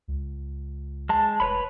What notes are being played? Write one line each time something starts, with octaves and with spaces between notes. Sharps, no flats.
C#2
G#3 A5
F1 B4 C#5 B5